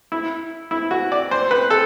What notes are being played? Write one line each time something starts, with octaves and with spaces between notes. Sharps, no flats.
E4
E4
F#4
D5
C5
B4
A4